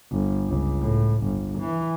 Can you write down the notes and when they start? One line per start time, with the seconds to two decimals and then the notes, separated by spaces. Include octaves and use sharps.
0.12 G1
0.48 C#2
0.81 A2
1.24 G1
1.59 E3